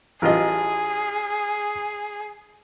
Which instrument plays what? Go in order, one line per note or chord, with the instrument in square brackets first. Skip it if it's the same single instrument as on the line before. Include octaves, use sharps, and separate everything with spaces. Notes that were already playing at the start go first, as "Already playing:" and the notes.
[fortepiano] A1 F4 D#5 [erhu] G#4